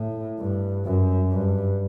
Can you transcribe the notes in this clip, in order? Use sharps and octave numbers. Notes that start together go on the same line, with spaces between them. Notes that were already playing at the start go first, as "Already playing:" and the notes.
Already playing: A2
G2
F#2
G2